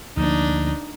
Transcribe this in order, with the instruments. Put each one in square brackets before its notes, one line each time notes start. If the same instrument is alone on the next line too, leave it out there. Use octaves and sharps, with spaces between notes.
[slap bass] D2 F3 A#3 [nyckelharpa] D4 D#4